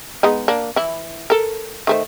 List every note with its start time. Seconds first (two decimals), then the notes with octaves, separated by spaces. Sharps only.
0.23 G#3 B3 D#4
0.48 A#3 D4
0.76 E3 E4
1.30 A4 A#4
1.87 D#3 A3 C5